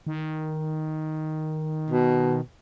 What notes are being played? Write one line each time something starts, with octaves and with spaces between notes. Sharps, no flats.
D#3
B2